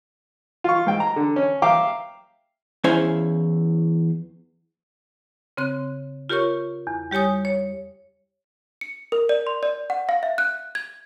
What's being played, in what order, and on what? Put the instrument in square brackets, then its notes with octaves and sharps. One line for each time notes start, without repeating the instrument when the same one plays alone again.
[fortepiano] F4 C#6
G#2 G5
A#5
D3
C#4
E5 F5 G5 A#5 D6
[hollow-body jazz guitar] E2 C#4 E4 C5 F5 G#5
[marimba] C#3 C4 F#6
F4 G4 A#4 C#5 C#6
E2
G3 G4 C#5 G#5 D#6
C#5
[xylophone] C#7
A#4
D5
C6
D5
F#5
F5
E5
F#6
G#6